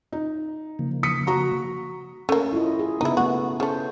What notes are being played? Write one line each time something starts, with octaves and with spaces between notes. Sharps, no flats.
D#4
C#3 F3 A#3
D#6 B6 C#7
F#4 A#5 C#6
A3 A#3 C#4
E4 F4 D#5
G#4
C#3 B3 D#4 E4
A3 B3 F#4
C#3 A3 C5